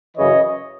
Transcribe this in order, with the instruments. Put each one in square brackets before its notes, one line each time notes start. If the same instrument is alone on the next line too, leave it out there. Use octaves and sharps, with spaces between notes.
[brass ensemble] F#2 C#3 E3 C#5 D#5